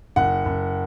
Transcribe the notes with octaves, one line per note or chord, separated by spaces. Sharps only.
F#1 F#5
F#1